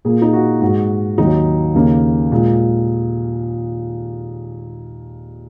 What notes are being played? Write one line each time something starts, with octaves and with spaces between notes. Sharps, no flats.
A#2 A#3 G#4
D#4
F#4
G#2 G#3 F#4
D#2 D#3 F#3 D#4
D#2 C#3 A#3
A#2 G#3